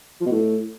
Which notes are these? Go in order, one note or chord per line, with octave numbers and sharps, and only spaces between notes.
F3
B2
A2